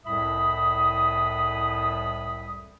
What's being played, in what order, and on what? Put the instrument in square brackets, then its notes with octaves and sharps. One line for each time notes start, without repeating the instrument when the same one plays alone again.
[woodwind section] C2 F2 A2 E5 B5 D#6